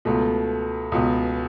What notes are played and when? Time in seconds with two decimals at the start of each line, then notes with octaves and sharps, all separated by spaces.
0.05 C#2 B2 A3
0.92 C#2 B2